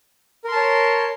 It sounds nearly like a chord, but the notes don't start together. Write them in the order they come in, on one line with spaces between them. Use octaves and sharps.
A#4 C6 A5 C#5